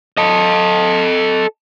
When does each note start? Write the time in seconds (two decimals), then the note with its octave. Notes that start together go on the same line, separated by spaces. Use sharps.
0.17 A4 D#5